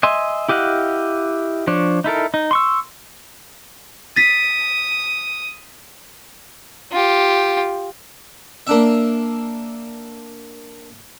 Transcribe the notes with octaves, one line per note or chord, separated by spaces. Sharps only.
D#5 E5 G#5 C6
E4 G4 D#5 F5 F#5
F3 D4 C#5
D#4 E4 A4 A#4
D#4
C6 C#6 E6
D#6 A6 B6
F4 G4
A#3 D4 E5